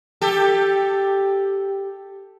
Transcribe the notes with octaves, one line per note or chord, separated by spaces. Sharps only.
G4 A4